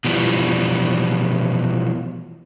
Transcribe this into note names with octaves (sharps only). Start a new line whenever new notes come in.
B2 E3 F3 G3